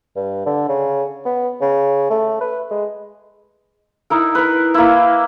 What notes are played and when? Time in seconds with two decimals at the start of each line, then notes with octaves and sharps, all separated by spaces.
0.16 G2
0.46 D3
0.68 C#3
1.25 B3
1.61 C#3
2.10 A3
2.41 B4
2.71 G#3
4.10 D#4 E4 A#4
4.35 A#4 B4
4.74 A#3 E4